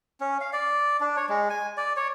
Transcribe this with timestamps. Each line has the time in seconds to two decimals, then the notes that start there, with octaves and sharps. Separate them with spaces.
0.20 C#4
0.41 F5
0.53 D5
1.00 D4
1.16 C#5
1.29 G#3
1.50 G#5
1.77 D5
1.97 C#5